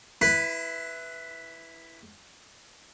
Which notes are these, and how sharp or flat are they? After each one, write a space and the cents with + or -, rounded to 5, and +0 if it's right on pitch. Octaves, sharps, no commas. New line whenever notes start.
E4 +0 B4 +0 B5 +40